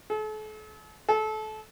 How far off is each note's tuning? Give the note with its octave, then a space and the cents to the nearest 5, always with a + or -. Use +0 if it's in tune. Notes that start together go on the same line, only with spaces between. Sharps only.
A4 -40
A4 -25